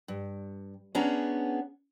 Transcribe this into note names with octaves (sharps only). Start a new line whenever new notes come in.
G2
B3 C#4 D4 G#4 C#5 A#5